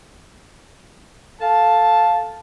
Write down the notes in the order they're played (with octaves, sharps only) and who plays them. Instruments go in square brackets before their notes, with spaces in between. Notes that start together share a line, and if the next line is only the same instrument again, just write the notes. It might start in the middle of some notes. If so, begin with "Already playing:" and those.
[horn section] A4 F5 A5